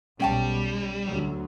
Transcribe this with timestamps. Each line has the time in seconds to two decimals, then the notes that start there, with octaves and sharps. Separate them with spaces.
0.20 B1 G3 C#4 G5 A5
1.05 D2 F#3